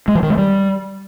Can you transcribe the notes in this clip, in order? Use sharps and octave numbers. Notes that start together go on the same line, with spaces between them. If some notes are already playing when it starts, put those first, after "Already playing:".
G#3
E3
D#3
G#3
G3